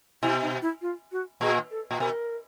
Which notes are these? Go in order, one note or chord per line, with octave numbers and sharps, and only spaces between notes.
B2 E4
D#4
E4
F4
F#4
A#2 G#4
A4
A#2
B2 A#4